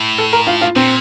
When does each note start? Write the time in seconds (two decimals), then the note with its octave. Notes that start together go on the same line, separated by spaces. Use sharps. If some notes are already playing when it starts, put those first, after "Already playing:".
Already playing: A2
0.18 A4
0.33 A#4
0.47 F4
0.61 F4
0.76 A#2 C4